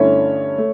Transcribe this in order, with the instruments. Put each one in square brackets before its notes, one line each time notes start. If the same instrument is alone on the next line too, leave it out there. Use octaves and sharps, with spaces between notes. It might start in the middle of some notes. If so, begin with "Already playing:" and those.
Already playing: [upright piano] G2 D3 A3 C#4 E4 [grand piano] C#5
[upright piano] A3